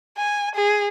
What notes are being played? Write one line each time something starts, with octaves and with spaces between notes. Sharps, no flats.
G#5
G#4